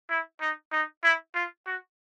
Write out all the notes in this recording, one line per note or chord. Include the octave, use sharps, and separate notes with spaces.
E4
D#4
D#4
E4
F4
F#4